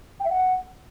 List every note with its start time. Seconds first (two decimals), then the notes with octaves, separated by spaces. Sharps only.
0.20 G5
0.25 E5
0.30 F#5